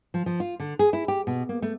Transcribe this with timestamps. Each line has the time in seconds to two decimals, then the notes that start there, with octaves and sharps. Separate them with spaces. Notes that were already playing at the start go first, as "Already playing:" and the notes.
0.14 F3
0.26 F3
0.40 F4
0.60 D3
0.79 G#4
0.93 E4
1.08 G4
1.27 B2
1.49 A#3
1.62 A3